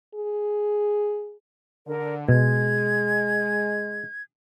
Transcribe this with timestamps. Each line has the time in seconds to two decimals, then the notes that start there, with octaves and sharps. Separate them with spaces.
0.15 G#4
1.87 D3 A#4
2.29 B2 G#3 G#6